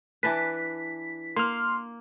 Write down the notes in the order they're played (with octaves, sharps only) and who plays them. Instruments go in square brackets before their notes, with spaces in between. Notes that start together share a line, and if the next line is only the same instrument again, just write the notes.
[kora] E3 D4 B4 [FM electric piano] B6
[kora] A#3 [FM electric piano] C6 F6